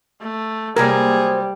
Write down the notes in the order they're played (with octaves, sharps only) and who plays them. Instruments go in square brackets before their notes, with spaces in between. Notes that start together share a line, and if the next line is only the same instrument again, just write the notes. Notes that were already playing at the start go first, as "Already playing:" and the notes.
[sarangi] A3
[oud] C3 F#3 A#3 [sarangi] G3 [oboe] G#4 [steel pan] A#4